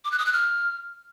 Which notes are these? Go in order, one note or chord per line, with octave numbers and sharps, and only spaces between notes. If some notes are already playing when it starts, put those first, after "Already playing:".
D6
F#6
D#6
F#6
F6